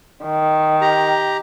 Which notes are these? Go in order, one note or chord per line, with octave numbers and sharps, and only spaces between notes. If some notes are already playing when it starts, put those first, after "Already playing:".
D#3
G4 A#5